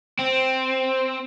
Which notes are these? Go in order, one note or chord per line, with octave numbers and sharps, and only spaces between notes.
C4